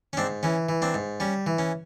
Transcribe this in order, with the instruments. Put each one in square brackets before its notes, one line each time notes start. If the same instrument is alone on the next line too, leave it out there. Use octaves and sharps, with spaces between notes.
[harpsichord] C#4
G#2 C4 D4
E3 C#4
E3
C4 D4
G#2
G3 C#4
E3
C#4